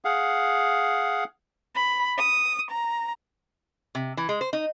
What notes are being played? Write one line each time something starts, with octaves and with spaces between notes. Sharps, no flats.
G#4 F5 F#5
B5
D#6
A#5
C3
E3
G#3
C5
D#4